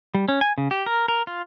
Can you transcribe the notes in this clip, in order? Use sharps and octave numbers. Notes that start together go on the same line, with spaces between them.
G3
C#4
G#5
C#3
G4
A#4
A#4
F4